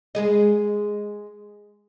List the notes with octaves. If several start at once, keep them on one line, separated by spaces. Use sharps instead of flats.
G#3 G#4 D#5